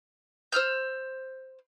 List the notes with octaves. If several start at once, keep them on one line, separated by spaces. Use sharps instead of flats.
C5 E6 F6 G6